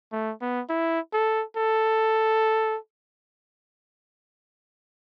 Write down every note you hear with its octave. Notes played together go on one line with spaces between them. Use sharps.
A3
B3
E4
A4
A4